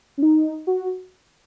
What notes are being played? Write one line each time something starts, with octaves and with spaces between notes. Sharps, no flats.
C#4
D#4
F#4